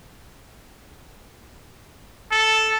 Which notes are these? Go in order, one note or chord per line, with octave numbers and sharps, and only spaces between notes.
A4